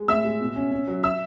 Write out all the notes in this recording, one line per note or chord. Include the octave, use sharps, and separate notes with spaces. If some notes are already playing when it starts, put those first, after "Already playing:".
Already playing: G#3
A2 E5 E6
G#3
B2
C#4
C#4
F#3
E5 E6